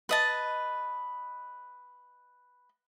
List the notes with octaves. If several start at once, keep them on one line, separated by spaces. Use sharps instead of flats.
B4 D#5 A5